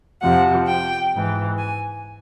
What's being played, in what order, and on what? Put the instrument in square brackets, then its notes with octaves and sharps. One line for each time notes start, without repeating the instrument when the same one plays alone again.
[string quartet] F2 C3 F3 F#5
G5
G#2 E3
G#5